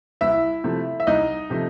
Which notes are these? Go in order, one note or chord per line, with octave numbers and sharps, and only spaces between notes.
C2 E4 E5
C3 F3 A3
E5
C2 D#4 D#5
C3 F3 A3